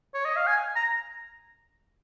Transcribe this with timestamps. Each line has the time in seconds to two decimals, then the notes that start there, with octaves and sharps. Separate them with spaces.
0.14 C#5
0.25 D#5
0.36 F5
0.47 G#5
0.76 A#5